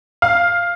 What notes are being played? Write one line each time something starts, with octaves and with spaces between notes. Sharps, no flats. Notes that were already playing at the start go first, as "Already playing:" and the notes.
F5